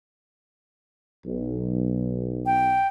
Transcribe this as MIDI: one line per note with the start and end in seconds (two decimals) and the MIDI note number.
1.26 2.81 35
2.46 2.87 79